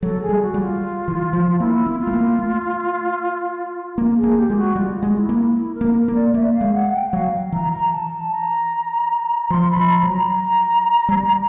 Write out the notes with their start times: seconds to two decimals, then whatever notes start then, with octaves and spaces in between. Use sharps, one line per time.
0.02 F#3 A4
0.22 G#4
0.29 G3
0.41 F#4
0.54 G3
0.61 F4
1.08 E3
1.33 F3
1.60 A#3 E4
1.87 B3
1.99 F4
2.07 A3
2.13 A#3
2.39 A3
3.98 A#3
4.17 G#4
4.23 A#3
4.37 G4
4.50 G#3 F4
4.56 F#4
4.76 G3 F4
4.96 F4
5.03 G#3
5.16 E4
5.29 A#3
5.35 E4
5.55 E4
5.75 A#4
5.81 A#3
5.94 A#4
6.08 A#3
6.14 D5
6.34 A#3 E5
6.53 F5
6.61 G#3
6.73 F#5
6.94 G5
7.07 F#5
7.13 F#3 F5
7.52 E3 A#5
7.72 A#5
7.92 A5
8.32 A#5
9.50 F3 C6
9.70 B5
9.77 F3
9.90 A#5
10.03 F#3
10.09 A#5
11.09 G3